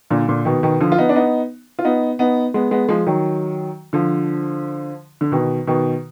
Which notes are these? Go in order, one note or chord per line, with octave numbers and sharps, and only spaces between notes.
A#2 D3
A#2 D3
B2 D#3
B2 D#3
D3 F3
F4
B3 D#4
D4
B3 D#4
F4
B3 D#4
B3 D#4
G#3 B3
G#3 B3
F3 G#3
D#3 F#3
D3 F3
D3
B2 D#3
B2 D#3